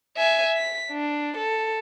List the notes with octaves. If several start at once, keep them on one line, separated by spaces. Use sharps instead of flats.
E5 G#5
B6
D4
A4